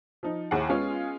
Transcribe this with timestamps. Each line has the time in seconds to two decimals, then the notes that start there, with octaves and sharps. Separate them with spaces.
0.23 F3 D#4
0.51 D#2 E4 G#4 F#5
0.69 G#3 B3 C#4 F4 G#4